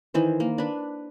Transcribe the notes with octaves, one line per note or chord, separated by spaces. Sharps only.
D#3 E3 C5
A#3
D4 B4